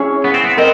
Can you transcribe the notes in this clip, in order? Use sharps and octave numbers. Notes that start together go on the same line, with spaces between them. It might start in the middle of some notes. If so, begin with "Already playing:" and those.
Already playing: C#4 E4 G#4 C#5
B3
C4
B3
C4 A#4 D#5